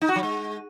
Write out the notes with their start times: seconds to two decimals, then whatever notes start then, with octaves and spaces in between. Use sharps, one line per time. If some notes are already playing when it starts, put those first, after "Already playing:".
0.01 D#4
0.09 F#4
0.16 F#3
0.23 G#3